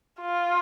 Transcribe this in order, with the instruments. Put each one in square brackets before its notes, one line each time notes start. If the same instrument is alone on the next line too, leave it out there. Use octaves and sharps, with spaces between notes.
[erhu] F4